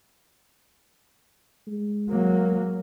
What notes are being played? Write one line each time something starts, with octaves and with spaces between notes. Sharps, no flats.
G#3
F#3 A#3